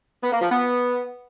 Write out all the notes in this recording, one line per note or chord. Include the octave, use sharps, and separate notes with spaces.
B3
A#3
F3
B3